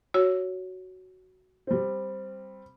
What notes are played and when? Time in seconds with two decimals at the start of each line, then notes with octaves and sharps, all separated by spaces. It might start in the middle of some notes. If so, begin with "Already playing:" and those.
0.14 F#4 C#5 E6
1.67 G3 C4